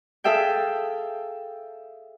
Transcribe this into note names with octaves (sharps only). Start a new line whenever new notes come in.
G#4 A4 E5 F5 G5